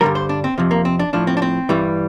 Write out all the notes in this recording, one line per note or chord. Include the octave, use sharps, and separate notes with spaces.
G2 D3 G3 A#4
C5
D4
C4
F2 C3 F3
A#3
C4
D4
A2 F3 D4
C4
D4
C4
G2 E3 G3